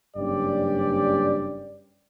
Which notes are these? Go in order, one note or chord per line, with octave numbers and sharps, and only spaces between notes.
F#1 G2 C#4 G4 D5